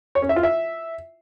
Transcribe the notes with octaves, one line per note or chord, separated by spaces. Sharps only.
C#5
C#4
E5
F4
E5